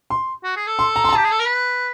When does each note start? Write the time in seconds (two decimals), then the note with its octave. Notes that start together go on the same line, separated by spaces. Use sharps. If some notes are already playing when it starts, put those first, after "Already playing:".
0.10 C6
0.44 F#4
0.56 G#4
0.67 A4
0.79 C6
0.96 A#5
1.04 C6
1.09 A#5
1.13 G4 A5
1.24 G#4
1.31 A4
1.40 A#4
1.46 B4